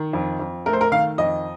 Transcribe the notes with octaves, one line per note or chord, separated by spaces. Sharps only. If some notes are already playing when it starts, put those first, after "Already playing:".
Already playing: D#3
F2
F2
A3 A#4
C5
A#4
D#3 F5
F2 D#5